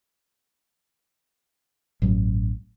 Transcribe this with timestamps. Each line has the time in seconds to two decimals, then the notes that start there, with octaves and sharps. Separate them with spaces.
2.02 A1 G2 F#3